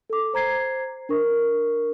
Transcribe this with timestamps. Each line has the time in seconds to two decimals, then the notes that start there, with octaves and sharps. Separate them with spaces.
0.10 A4 D6
0.34 C5 A#5 G#6 C7
1.09 D4 A#4 C#6